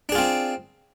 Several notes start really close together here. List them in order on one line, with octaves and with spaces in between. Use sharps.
D4 G#4 F4 C4